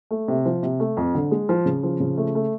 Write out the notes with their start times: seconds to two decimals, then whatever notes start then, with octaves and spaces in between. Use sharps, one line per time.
0.11 A3
0.28 C3
0.45 F3
0.63 C3
0.80 A3
0.97 F2
1.15 D3
1.31 G#3
1.49 F3
1.66 C#3
1.83 F3
2.00 C#3
2.17 A3
2.35 A3